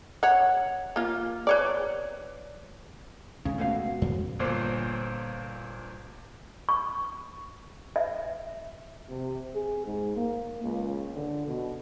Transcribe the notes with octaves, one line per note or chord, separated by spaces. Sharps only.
C#5 F#5
A#3 F4
B4 C#5 D5
C#2 C#3
C#2 B2 A3 F5
F2
G1 A#2 C5
C#6
E5
C3
G#4
G#2
A#3
C#2
D3
B2